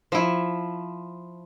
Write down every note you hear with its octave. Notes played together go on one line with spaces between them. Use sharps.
F3 E4